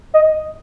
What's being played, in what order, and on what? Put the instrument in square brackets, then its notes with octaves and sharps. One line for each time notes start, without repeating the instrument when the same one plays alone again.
[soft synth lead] D#5